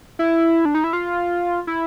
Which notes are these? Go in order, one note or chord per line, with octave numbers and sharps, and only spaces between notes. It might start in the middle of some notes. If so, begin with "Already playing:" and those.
E4
D4
D#4
E4
F4
E4